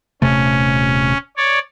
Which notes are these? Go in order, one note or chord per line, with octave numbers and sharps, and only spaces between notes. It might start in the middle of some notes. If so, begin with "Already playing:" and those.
D#1 C3 A3 C#4
C#5 D5